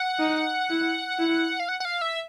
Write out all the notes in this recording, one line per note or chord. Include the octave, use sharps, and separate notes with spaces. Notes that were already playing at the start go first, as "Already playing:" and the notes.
Already playing: F#5
D#4
E4
E4
F5
F#5
F#5
F5
E5